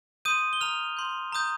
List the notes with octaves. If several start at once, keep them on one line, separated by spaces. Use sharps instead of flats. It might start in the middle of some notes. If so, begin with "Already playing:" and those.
C6 D#6 G6 D#7
G7
A#5 F6 F7
C6 G6
A#5 D#6 G6